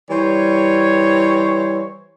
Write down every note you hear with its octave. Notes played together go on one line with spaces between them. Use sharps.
E3 G3 C5 C#5